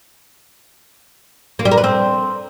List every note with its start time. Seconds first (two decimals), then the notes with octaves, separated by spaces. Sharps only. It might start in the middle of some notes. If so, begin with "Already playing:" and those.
1.59 A#3
1.65 G3
1.71 A#4
1.78 B4
1.84 C4